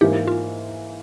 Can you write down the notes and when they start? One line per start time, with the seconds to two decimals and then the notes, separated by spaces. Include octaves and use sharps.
0.01 G#2 E3 A#3 G4
0.27 F4